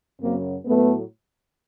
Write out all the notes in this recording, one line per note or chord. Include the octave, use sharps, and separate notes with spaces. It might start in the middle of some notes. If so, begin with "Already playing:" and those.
F#2 C#3 F#3 A#3 C4
A2 F#3 A3 B3